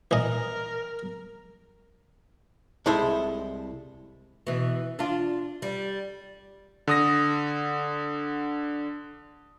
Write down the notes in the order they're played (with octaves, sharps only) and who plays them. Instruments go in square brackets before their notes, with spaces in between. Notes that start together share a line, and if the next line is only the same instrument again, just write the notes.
[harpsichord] E3 D#5 [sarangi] A#4
[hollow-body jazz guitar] C2 G#3 E4 A4 C5
[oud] B2 E3
D4 F4
G3
[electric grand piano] D3 D#6 A#6